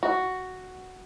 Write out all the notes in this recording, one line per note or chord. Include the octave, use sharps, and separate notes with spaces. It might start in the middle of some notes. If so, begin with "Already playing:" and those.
F#4